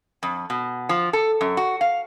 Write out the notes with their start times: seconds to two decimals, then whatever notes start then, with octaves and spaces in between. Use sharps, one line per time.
0.23 F2
0.50 B2
0.89 F3
1.13 A4
1.41 F#2
1.57 F#4
1.81 F5